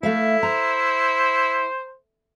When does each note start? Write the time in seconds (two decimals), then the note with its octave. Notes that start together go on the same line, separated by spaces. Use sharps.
0.03 A3 E4 E5 F5
0.43 C5 A#5